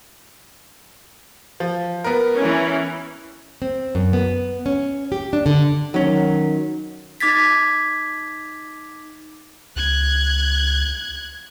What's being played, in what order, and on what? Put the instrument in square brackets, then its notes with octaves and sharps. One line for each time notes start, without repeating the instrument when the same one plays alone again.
[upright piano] F3
B3 A#4
[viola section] E3 C#4
[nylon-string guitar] C4
F#2
B3
C#4
G4
D4
D3
[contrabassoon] D#3 [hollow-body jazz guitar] F#3 C#4
[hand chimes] D#4 D6 G#6 A6 B6
[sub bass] C#2 [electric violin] F#6 G#6